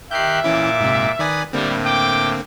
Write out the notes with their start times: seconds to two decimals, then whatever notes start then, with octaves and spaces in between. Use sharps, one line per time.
0.11 D#3 G4 E5 F#6 G6 C7
0.44 A#2 E3 C#4 E4 D6
0.81 G#2 C3
1.19 D#3 B4 D5 G#5 D#6
1.53 A2 D3 G3 A#3 C4
1.86 G5 D6